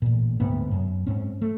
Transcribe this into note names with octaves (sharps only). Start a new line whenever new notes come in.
A1 A#2
D2 G#2 C3 B3
F#2
G#2 C4 C#4
A3